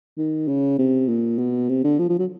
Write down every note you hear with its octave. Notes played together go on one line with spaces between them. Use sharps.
D#3
C#3
C3
A#2
B2
C3
D3
F3
F3
F#3